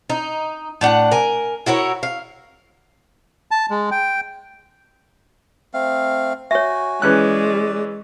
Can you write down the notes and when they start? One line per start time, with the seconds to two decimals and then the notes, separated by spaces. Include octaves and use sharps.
0.10 D#4
0.81 A2 D4 F#5
1.12 A#4 G#5
1.66 E4 F#4 A#4 C#5
2.03 F5
3.51 A5
3.71 G#3
3.91 G5
5.74 A3 C4 F5
6.51 F#4 C#5 E5 G#5
7.02 E3 G#3 C#4 D5 F#6